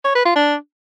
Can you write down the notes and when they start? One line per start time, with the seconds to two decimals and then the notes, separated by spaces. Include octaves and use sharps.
0.05 C#5
0.15 B4
0.25 F4
0.36 D4